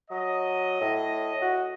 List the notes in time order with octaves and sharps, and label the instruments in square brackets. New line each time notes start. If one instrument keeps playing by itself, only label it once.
[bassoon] F#3 [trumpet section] D#5
[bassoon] A2
F#4